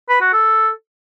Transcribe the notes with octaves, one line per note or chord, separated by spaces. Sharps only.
B4
F#4
A4